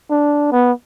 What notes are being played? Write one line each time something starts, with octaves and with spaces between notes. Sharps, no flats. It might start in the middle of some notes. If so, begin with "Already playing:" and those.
D4
B3